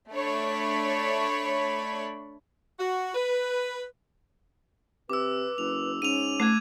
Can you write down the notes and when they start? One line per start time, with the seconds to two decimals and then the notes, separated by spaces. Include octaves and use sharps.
0.12 A3 D4 C#5 B5
2.79 F#4
3.14 B4
5.10 C3 B4 D6 E6
5.58 F#1 F7
6.02 G#2 C#4 D#7 F7
6.40 A3 D6 F#6 G#6